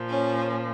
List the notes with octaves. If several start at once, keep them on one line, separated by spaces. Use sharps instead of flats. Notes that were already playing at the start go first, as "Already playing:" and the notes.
Already playing: A#2 F3
C#4